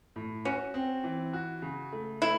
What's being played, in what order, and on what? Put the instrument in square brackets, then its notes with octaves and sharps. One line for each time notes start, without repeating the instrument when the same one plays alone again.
[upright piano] A2
[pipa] C#4 [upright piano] F#4
[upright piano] C4
E3
F#4
C#3
A3
[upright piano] A3 [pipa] E4